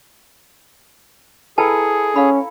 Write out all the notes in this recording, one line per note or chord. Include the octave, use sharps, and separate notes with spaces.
E4 G#4 A4 B4 G5 A5 A#5
C#4 F5 B5